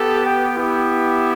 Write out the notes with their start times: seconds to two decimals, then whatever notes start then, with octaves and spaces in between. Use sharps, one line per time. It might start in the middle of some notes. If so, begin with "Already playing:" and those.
Already playing: B3 G4 A4
0.26 G5
0.56 B3 E4 G4